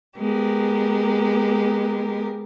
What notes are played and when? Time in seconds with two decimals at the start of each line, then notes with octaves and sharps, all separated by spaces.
0.17 G#3 B3 G4 A#4